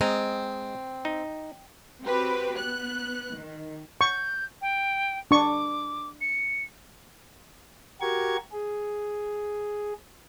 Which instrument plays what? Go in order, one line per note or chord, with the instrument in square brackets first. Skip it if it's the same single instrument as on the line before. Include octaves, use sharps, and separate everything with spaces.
[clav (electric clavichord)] G#3 D#5 A#5 [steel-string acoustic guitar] C4
[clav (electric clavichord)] D#4
[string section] C4 F#4 G4 B4
B3 F#6
D#3
[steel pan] C#6 [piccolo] G6
[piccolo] G5
[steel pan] D4 C#6 [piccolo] D6
[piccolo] C#7
[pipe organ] F#4 G4 A#4 C#6 G#6
G#4